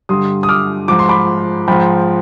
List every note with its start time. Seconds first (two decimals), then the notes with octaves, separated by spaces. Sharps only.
0.09 G2 D3 G3 C6 D#6
0.43 D#6
0.49 D6 F6
0.88 G#2 F3 D6
0.99 C6
1.09 B5 D6
1.68 G#2 F3 G5 B5